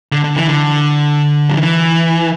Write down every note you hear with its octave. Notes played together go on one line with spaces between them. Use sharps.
D3
D3
E3
D3
F#3
E3